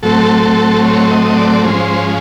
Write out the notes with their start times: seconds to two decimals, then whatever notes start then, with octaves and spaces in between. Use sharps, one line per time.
0.03 A2 F#3 A3 C4 A4
0.43 A4
0.84 C#5
1.11 D#5
1.27 D#5
1.37 D5
1.64 G#2 F3 G#3 C#4 C5